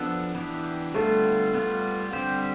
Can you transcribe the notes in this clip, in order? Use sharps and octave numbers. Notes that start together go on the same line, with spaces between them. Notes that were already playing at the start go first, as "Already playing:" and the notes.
Already playing: F3 B3 D4 A4
E3 B3 D4 G4
D3 G3 A3 B3 F4 A4
G3 B3 F4
D3 G3 C4 G4 C5